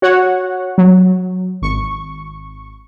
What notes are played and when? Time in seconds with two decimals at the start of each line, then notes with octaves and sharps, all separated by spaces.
0.02 F#4 C#5 F#5
0.78 F#3
1.62 G#1 C#6